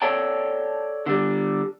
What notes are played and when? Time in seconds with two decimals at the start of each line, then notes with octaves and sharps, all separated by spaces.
0.02 A4 C#5 D5 G5 A5
1.06 D3 G3